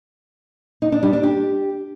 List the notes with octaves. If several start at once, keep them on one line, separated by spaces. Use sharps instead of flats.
D#4
D4
G3
D4
G4